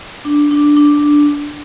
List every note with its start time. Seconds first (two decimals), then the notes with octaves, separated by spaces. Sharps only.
0.25 D4
0.51 D4
0.77 D4